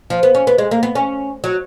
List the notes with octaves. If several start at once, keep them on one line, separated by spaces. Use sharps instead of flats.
F3
B3
C#4
B3
G#3
A#3
B3
C#4
F#3